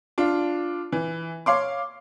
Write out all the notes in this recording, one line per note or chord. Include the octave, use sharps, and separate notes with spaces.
D4 F4
E3
C#5 F5 C6 D6